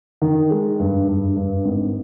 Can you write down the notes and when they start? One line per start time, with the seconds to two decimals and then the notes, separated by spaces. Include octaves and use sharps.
0.22 D#3
0.51 G#3
0.79 G2
1.08 G2
1.36 G2
1.65 G#1